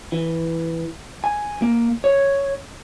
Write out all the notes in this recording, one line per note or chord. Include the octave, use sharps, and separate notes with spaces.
E3
G#5
A#3
C#5